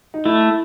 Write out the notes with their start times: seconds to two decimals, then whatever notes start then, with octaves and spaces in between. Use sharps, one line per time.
0.14 D#4
0.25 A3 E4